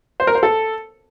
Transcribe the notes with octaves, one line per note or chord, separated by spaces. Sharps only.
C5
A#4
C5
A4